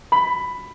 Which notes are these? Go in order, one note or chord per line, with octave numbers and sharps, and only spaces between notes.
B5